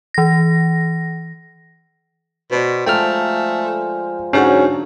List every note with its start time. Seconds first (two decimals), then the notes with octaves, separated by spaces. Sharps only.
0.14 E3 A#6
2.51 B2 C5 D5
2.86 F3 G#3 A3 G5 A#5 F6
4.33 G#2 D3 F#3 C#4 F#4